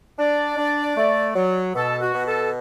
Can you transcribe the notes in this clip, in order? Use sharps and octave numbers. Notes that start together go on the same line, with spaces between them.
D4 D5
D4
A3
F#3
B2 A4
F#4
B2
A4